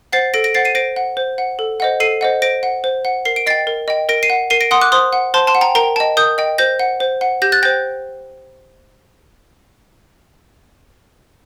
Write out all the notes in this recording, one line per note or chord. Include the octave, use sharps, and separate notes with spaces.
C5 F#5 A6 C7
A4 A#6 D7
A#6 D7
C5 F#5 A6 C7
C7 D#7
C5 A#6 D7
F#5
C5
F#5
A4
C5 D#5 F#5
A4 C7 D#7
C5 D#5 F#5
C5 A#6 D7
F#5
C5
F#5
A#4 C7
D7
D#5 G5 A6 C7
A#4
D#5 G5
A#4 A#6 D7
C7 D#7
F#5
A#4 C7 D#7
A#6 D7
F#5 C6 D#6
D6 F#6
C5 C6 D#6
F#5
C5 A5 C6
A5 C6
F#5
G5 A#5
A#4 G5 A#5
D#5 G5 A5
A#4 D#6 G6
D#5 G5
C5 G6 A#6
F#5
C5
F#5
G4 G6 A#6
F#6 A6
C5 G5 G6 A#6